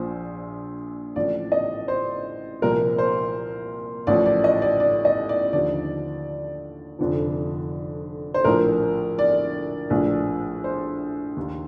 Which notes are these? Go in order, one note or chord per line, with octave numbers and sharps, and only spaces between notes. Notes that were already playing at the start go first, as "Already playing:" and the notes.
Already playing: A#1 A#2 F3 C5
A1 A2 F3 D5
D#5
C5
C2 A#2 F3 A#4
C5
A1 A2 F3 D5
D5
D#5
D5
D5
D#5
D5
D#2 D3 F3 D5
F1 F2 D3 F3
C5
A#1 A2 F3 A#4
D5
A#1 A2 F3
C5
D#2 D#3